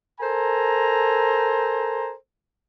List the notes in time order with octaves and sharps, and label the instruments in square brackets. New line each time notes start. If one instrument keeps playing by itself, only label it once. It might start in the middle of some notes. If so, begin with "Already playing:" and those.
[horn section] A4 A#4 C5 G#5 A#5